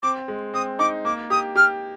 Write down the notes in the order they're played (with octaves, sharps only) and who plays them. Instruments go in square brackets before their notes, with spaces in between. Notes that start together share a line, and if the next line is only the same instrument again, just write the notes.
[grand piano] C4 [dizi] D6
[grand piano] G#3
[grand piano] C4 [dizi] D#6
[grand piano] D#4 [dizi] D6
[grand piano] A#3 [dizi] D6
[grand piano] G4 [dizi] D#6
[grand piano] G4 [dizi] F6